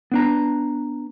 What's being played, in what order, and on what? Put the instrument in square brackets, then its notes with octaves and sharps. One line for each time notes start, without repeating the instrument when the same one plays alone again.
[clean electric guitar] B3 D4 A#5